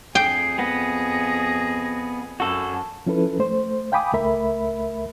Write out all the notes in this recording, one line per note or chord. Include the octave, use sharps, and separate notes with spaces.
F2 G#4 G5 C7
B3 A#6
F#2 F#4 A4
F3 C#4 E4 A4 B4
A3 C5
F5 G5 G#5 B5 D6 D#6
C#2 A3 A#4 E5 B5